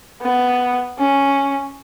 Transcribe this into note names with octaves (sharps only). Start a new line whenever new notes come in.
B3
C#4